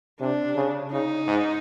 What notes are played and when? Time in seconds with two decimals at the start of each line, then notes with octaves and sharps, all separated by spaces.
0.20 C3 D4
0.56 C#3
0.91 C#3 D#4
1.27 G#2